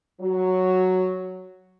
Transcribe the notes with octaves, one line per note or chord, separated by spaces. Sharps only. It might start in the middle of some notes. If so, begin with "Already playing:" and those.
F#3